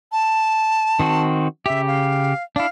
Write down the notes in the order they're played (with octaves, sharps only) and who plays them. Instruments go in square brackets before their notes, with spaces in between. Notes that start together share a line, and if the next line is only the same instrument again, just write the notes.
[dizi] A5
[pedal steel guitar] D#3 C4 F#4
[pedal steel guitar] C#3 G4 [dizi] E5
[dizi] F5
[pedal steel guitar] D4 E4 [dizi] F5